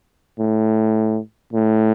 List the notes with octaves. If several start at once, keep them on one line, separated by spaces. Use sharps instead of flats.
A2
A2